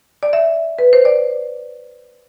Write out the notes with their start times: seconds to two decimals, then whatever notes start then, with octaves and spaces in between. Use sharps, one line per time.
0.23 D5
0.33 E5
0.79 B4
0.93 C5
1.05 D5